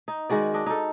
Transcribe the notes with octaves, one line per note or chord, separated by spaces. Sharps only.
D#4
D#3 G#3 F#4 D5
D4 D#5
D#4 A4